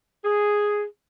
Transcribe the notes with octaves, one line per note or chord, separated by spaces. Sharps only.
G#4